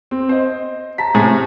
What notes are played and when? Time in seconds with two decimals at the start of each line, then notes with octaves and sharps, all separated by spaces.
0.11 C4
0.29 C5 D#5
0.98 A5 A#5 B6
1.15 A2 C3 G#4